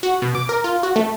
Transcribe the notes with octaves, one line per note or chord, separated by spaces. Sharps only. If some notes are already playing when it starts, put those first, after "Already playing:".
F#4
B2
D6
A#4
F4
F#4
A3